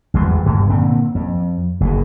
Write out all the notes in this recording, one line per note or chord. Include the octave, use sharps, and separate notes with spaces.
G#1 E2 G3
G2 B2
A#2 D3 C4
F2
F#1 B2